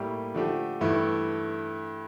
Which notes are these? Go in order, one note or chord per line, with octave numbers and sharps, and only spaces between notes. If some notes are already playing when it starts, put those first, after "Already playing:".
Already playing: A2 G3 A#3 E4 G4
D3 F3 A3 D4 G4
G2 E3 A3 E4